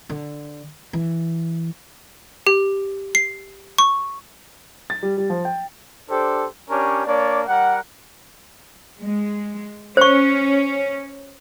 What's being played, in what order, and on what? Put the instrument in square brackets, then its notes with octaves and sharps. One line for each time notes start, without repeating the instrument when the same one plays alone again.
[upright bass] D3
E3
[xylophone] G4
C7
C#6
[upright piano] A6
G3
G3
F3
G5
[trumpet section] D4 G4 A4 C5
C#4 D4 G4 A#4 C#5
A#3 D4 C#5 D5
G3 A#4 F#5
[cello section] G#3
[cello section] C#4 [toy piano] C5 C#6